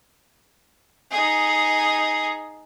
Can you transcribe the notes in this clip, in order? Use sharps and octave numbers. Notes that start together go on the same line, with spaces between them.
D#4 G#4